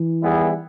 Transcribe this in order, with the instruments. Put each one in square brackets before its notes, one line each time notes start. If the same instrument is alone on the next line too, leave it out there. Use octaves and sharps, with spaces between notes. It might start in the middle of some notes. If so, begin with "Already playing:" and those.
Already playing: [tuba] E3
[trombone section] D#3 G3 B3 E4 G#4